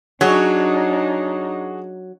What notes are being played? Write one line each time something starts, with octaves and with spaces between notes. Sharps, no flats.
F#3 D4 D#4 F#4 G#4 C#5